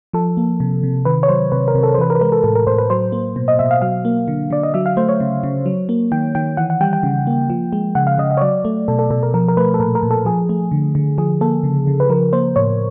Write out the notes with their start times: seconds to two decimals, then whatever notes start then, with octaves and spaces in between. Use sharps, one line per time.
0.13 F3 A4
0.37 A#3
0.60 C3
0.83 C3
1.05 D#3 B4
1.23 C#5
1.28 F#3 C5
1.52 C3 B4
1.68 A#4
1.75 C3
1.83 A4
1.94 C5
1.98 E3 B4
2.10 A#4
2.15 B4
2.21 G#3 A#4
2.32 A4
2.44 A2 A4
2.55 A#4
2.67 A2 C5
2.78 B4
2.90 F#3 C5
3.12 A#3
3.36 B2
3.48 D#5
3.59 B2 E5
3.71 F5
3.82 F#3 F5
4.05 A#3
4.28 D3
4.51 D3 D5
4.63 D#5
4.74 F#3 E5
4.86 F5
4.97 A3 C5
5.09 C#5
5.20 C#3
5.43 C#3
5.66 F#3
5.89 A#3
6.12 D#3 G5
6.35 D#3 G5
6.57 E3 F#5
6.70 F#5
6.81 G3 G5
6.93 G5
7.03 C#3
7.27 A#3
7.50 F3
7.73 G#3
7.95 C#3 F#5
8.07 F5
8.18 C#3 D#5
8.31 D#5
8.37 C#5
8.41 F#3 D5
8.65 A3
8.88 B2 A4
8.99 A4
9.10 B2 A4
9.23 A#4
9.34 F3 A#4
9.48 A#4
9.57 A3 B4
9.74 A4
9.79 A#2 A#4
9.95 A#4
10.03 A#2
10.11 A4
10.25 F3 G#4
10.49 A3
10.72 D3
10.95 D3
11.18 F3 G#4
11.41 A#3 A4
11.64 C#3
11.87 C#3
12.00 B4
12.09 F3 A#4
12.33 A#3 C5
12.56 A2 C#5